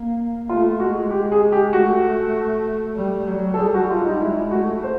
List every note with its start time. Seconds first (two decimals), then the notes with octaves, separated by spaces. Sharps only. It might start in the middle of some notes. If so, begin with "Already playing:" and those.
Already playing: A#3
0.49 A3 F4
0.80 G#3 F#4
1.11 G4
1.32 G#4
1.52 G4
1.72 A3 F#4
2.96 G3
3.28 F#3
3.54 A4
3.58 G3 G#4
3.74 F#4
3.90 F4
4.05 D#4
4.20 G#3 E4
4.51 A3 F#4
4.83 C5